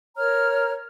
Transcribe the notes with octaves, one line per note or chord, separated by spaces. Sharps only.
A#4 C#5 A#5 F6